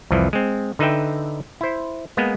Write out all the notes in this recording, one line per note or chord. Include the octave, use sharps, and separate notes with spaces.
C2 F2 E3 F3
G#3 C4
D3 D#4 B4 E5 G5
E4 C5
G#3 A#3 B3